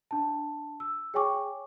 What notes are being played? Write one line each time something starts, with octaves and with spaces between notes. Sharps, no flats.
D4 A5
E6
G#4 C#5 G5 G#5 C#6 D6